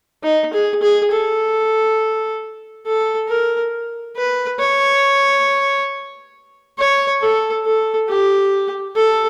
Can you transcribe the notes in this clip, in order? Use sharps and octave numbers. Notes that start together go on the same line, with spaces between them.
D#4
G#4
G#4
A4
A4
A#4
B4
C#5
C#5
A4
A4
G4
A4